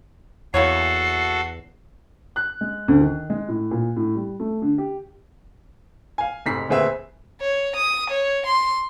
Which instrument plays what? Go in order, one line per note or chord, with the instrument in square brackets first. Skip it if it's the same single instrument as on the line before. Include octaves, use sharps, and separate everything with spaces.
[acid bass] E2 [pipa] A#3 E4 C#5 [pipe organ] F#4 A4 [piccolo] C7
[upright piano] F#6
G#3
D2
D#3
G#3
A2
A#2
A2
G3
A3
D3
G4
F5 G#5
F1 G#2 B6 C7
D#1 D2 C4 G#4 B4 E5
[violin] C#5
D#6
C#5
C6